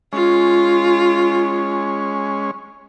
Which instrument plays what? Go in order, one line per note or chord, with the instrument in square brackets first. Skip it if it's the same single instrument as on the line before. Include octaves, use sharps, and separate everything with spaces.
[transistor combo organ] G#3 C#4 [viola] F4